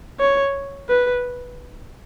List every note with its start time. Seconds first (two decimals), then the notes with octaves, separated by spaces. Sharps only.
0.20 C#5
0.89 B4